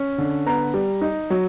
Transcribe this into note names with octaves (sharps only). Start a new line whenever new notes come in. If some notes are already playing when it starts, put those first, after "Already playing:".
Already playing: C#4
D3
B3 A#5
G3
D#4
F#3